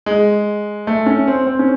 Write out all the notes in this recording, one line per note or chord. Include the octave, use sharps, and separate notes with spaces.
G#3
A3
C#4
C4
C4
C#4